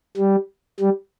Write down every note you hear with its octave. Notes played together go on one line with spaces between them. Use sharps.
G3
G3